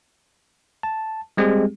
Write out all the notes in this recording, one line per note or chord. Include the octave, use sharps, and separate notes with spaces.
A5
G3 G#3 C4 G4 G#4